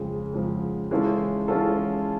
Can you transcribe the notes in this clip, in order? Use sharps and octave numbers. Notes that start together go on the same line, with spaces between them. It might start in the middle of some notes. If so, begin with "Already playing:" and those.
Already playing: F2 C#3 F3 G#3
F2 C#3 F3 G#3
E3 G#3 C#4 F4 A4
E3 G#3 C#4 F4 A4